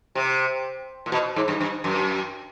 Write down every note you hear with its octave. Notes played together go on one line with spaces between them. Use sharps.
C3
A#2
B2
G#2
G2
G2
F#2